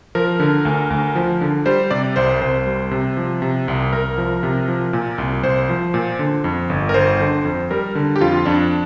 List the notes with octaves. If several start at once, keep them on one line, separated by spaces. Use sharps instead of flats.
F3 A#4
D3
D2
D2
F3
D3
G3 C5
C3 D5
C2 C5
C2 C5
G3
C3
F3
C3
C2
C2 A#4
F3
C3
F3
A#2
C2
C2 C5
F3
A#2
D3
F2
G1
A#4
G1 C5
D3
F2
G3 A#4
D3
G4
F2 F4
F2 D4